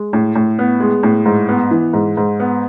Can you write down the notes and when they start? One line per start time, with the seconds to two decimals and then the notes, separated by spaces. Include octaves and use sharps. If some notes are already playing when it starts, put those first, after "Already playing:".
Already playing: G#3
0.13 A2
0.35 A2
0.59 B3
0.80 G#3
1.03 A2
1.25 G#2
1.49 B3
1.71 E3
1.93 G#2
2.17 G#2
2.40 B3